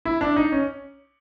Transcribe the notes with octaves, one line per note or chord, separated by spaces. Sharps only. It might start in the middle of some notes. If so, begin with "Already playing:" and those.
E4
D4
D#4
C#4